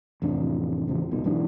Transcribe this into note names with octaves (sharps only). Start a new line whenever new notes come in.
A1 F2 C3 D4
A1 E2 C#3 F3
C2 B2 D#3
B1 G#2 E3 D4